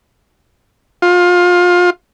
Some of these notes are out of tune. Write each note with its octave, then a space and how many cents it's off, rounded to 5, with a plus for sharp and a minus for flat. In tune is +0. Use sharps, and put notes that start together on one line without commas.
F4 +25